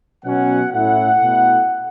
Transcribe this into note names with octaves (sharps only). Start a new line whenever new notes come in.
B2 F#3 C#4 F#5
A2 A3 C#4 E4 F#5
B2 A3 E4